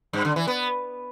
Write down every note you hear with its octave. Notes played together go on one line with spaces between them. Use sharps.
G2
D3
E3
B3